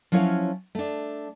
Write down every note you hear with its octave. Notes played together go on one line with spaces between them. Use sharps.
F3 F#3 C#4 E4 C#5 F5
A3 D4